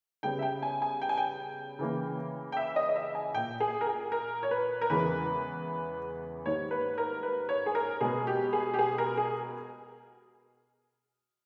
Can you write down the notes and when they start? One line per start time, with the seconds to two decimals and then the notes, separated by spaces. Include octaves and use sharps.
0.23 C#3 G3 B3 G5
0.39 E5
0.42 G5
0.63 G#5
0.82 G#5
1.02 G5
1.09 G#5
1.17 G5
1.79 C#3 E3 A#3
2.52 G5
2.57 E5
2.76 D#5
2.89 D#5
2.96 E5
3.15 G#5
3.34 A#2 A#3 G5
3.60 G#4
3.81 A#4
3.87 G#4
4.12 A#4
4.43 C#5
4.51 B4
4.81 A#4
4.90 E2 C#3 E3 G#3 B3 B4
6.46 G#2 D#3 G3 A#3 C#5
6.71 B4
6.98 A#4
7.23 B4
7.49 C#5
7.66 G#4
7.75 A#4
8.01 B2 G#3 B3 G#4
8.27 G4
8.53 G#4
8.74 G4
8.79 G#4
8.98 A#4
9.17 G#4